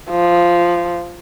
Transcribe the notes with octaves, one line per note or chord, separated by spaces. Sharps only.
F3